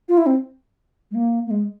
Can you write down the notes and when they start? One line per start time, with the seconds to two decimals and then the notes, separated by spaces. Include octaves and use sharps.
0.08 F4
0.17 E4
0.26 C4
1.11 G#3
1.15 A#3
1.46 A#3
1.51 G#3